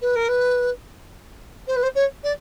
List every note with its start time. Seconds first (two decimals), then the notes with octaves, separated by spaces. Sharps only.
0.02 B4
0.16 A#4
0.28 B4
1.67 C5
1.76 B4
1.83 C5
1.95 C#5
2.23 D5